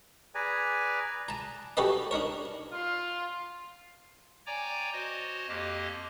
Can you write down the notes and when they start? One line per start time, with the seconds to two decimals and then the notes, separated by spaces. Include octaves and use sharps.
0.35 G#4 B4 D5 G#5 A#5
1.29 A5 A#5
1.77 C#4 F#4 G4 A4 B4 D#5
2.11 D4 D#4 A#4 C#5
2.71 F4
4.46 C#5 D5 G5 G#5 A#5 D6
4.92 F#4 C5 C#5 D#5
5.49 F2 A#3 G4 D#5